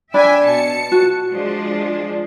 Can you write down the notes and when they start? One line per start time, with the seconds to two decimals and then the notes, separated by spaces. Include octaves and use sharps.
0.14 D4 D5 E5 G5 G#5 B5
0.47 B2 A5 C#7
0.92 F#4
1.30 F3 G#3 D4